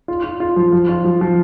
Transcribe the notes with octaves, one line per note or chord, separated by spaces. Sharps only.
F4
F4
F4
F3
F3
F4
F3
F3